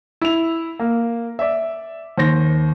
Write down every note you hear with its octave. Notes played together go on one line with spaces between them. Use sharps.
E4 F7
A#3
D5 E5
D#2 C5 A#6